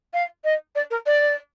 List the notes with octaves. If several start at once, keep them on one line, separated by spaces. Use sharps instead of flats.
F5
D#5
D5
A#4
D5